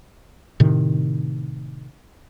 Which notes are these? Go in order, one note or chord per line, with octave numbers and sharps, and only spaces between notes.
A2 C3 D#3